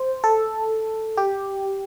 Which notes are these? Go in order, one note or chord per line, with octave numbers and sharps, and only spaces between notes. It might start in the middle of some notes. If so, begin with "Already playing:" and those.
Already playing: C5
A4
G4